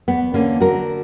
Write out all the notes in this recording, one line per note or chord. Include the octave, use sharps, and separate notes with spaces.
E2 B3
D3 A#3 C#4
D3 F#4 A#4